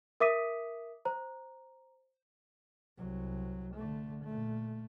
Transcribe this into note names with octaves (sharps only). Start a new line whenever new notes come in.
A#4 E5 D6 D#6 B6 D#7
C5 A#5
C2 F#3
D3 A3
A#2 A3